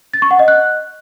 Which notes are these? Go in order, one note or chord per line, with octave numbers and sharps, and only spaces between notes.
A6
C#6
F#5
D#5
F#6